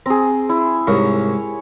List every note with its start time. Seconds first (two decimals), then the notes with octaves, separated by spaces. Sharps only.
0.06 C4 G#4 A#5
0.49 E4
0.87 C2 G#2 A#4 C#5